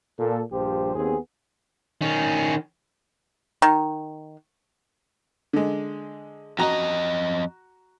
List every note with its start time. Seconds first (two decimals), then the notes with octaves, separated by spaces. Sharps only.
0.19 A#2 A4
0.52 A#1 G2 F3 G4 C5
0.96 D#2 B3 C4 G#4
2.01 D#3 C#4
3.62 D#3
5.53 D3 G#3
6.59 F2 F#4 D#5 A#5